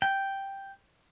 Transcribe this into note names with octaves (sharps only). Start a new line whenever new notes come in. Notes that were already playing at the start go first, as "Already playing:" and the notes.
G5